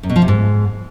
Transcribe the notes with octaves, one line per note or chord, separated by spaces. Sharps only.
F#2
B2
F3
C3
G#2